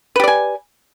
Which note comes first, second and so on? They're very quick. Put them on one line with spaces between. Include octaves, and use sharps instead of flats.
B4 G4 D5 G#5